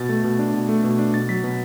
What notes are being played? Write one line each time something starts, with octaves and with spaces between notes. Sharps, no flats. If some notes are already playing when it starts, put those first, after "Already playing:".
Already playing: B2 A6
A3
B2
D4
B2
A3
B2
D4
B2 A6
F#3 B6
B2